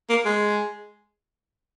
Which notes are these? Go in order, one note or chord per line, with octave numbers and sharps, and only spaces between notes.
A#3
G#3